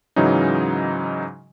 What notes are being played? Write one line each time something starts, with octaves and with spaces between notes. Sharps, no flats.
G#2 C#3 E3 F#3 C#4 D#4